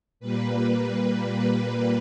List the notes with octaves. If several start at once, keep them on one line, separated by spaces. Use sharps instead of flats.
A#2 G3 A#3 B4